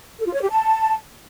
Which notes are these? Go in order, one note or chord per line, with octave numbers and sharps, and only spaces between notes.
A4
F4
C#5
G4
A5